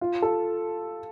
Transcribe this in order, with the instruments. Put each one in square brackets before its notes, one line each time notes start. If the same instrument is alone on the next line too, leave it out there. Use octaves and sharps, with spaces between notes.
[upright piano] F4
A4